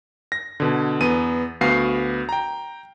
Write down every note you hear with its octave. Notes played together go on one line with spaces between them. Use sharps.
A#6
B2 D3
E2 B3 D#7
D2 B3 F#4 F5 C7
G5 A#5